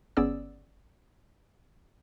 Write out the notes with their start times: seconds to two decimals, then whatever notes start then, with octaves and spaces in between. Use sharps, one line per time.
0.17 G1 B3 C#4 G#4 D5 E6